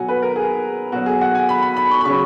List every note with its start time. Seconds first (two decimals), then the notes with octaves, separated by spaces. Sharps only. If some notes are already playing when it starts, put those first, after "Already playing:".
Already playing: B2 F#3 F#5 G#5
0.08 B4
0.22 A#4
0.36 G#4
0.92 B2 F#3 F#4
1.06 G#4
1.21 F#5
1.35 G#5
1.49 B5
1.63 B5
1.77 B5
1.91 C#6
2.01 B5
2.05 C#3 F#3 C#6